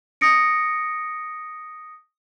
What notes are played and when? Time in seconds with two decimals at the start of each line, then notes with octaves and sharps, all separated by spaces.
0.21 D#6 A#6 C#7 D7